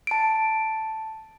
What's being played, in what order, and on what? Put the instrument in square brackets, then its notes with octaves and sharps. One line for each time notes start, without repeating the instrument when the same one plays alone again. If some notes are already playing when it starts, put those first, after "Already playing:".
[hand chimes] A5 D7